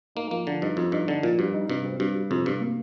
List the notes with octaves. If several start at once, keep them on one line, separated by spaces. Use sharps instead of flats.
A#3 D#4
F3 A#3
D3 F3
G2 D#4
F2 F3
G2 D#4
D3 D#4
A#2 F3
G2 G3
D#4
G2 C3
C4
G2 G3
G3
F2 C3
G2 C3
A#3